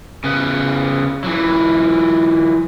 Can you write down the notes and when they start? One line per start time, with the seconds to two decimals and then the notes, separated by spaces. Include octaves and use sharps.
0.24 C#3 B3
1.24 E3 F#3